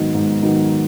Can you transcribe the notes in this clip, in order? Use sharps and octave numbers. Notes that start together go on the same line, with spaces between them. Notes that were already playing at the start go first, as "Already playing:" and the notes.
Already playing: G#2 D#3 F#3 B3 D#4
G#2
D#3 F#3 B3 D#4